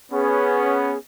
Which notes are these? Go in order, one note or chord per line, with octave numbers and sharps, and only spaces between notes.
B3 C#4 G#4